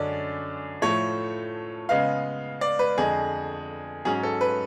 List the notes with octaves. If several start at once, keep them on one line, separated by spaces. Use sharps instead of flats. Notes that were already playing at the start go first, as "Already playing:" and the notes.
Already playing: F#2 D3 G#3 C#4 D5
A2 F3 A3 C#5
C#3 G#3 B3 F5
D5
B4
F2 D3 G#3 G#4
G#2 F#3 C#4 G#4
A4
B4